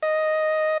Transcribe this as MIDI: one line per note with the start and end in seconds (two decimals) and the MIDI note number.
0.03 0.78 75